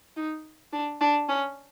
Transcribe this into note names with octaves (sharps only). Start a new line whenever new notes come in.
D#4
D4
D4
C#4